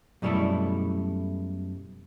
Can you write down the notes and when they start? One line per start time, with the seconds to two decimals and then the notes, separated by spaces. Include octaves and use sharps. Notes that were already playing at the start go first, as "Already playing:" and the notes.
0.22 F#2 B2 G3 A3 E4 A4